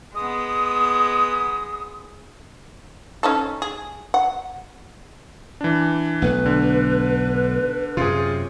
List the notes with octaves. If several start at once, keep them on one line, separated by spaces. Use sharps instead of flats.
G#3 B3 D#6
C#4 D#4 A4
G#4
F#5
E3 D4
B1 A3 B4
D3
F#2 C3 F4 G#4